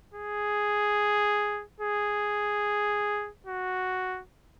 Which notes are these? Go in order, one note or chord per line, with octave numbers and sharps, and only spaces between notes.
G#4
G#4
F#4